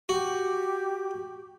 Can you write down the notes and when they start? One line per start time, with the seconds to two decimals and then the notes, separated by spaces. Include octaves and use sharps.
0.09 F#4 G4